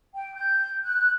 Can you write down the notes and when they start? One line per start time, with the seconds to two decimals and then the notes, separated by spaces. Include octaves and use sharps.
0.14 G5
0.34 G6
0.82 F#6